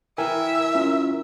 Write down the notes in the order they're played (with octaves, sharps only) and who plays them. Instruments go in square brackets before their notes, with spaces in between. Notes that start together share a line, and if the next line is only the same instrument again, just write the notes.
[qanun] E3 E4 [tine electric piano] A#4 G5 G#5 [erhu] E5
[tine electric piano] C#4 F4 A#4